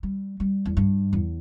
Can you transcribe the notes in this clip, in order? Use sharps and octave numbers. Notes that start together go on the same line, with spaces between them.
G3
G3
E2
G2
E2